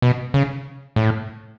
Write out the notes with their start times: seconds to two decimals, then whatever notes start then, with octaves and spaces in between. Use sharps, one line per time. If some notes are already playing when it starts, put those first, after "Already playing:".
0.02 B2
0.34 C#3
0.96 A2